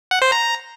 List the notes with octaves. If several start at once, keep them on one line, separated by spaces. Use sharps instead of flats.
F#5
C5
A#5